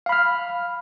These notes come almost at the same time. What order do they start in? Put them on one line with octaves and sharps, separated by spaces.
F5 B5 F6